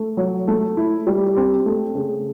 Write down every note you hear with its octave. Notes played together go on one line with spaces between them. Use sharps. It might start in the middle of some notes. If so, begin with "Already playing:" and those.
Already playing: A3
F#3
A3
E4
G3
C4
A3
C#3